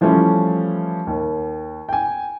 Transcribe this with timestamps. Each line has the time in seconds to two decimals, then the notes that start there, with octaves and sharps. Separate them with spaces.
0.01 E3 F3 G3 A3 C#4 E4
1.07 D#2
1.89 G5 G#5